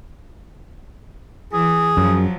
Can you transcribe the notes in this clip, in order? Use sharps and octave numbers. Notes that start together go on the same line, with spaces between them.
E3 G#4
F#2 F3 F#3